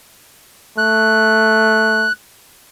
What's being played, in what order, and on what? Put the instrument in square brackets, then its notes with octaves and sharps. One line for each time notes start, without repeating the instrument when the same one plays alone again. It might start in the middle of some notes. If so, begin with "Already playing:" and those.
[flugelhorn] A3 [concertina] F#6